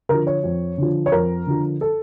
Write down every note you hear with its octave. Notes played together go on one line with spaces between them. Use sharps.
D3 F3 A#4
C#5
F2
D3 F3
C#5
F2 A#4
D3 F3
A4